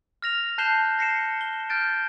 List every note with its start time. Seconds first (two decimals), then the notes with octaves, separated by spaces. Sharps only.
0.22 F6 A#6 F7
0.58 A5 F#6 G6 C7 E7 G7
0.99 A#6 C7 C#7 E7
1.41 G7
1.70 F6 G6 A6 D7